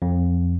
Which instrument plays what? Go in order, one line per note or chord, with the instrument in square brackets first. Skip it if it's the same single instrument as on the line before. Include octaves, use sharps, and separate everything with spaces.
[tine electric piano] F2